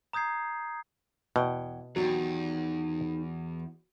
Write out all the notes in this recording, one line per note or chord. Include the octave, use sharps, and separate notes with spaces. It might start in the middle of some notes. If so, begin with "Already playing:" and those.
A#5 D#6 G6 G#6 C7
E2 B2 F#5 G5
E2 D#3 F#3 D#4 G4